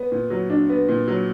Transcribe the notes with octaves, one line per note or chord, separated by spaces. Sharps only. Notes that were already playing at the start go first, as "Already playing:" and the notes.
Already playing: B3
A#2
F#3
D4
B3
A#2
F#3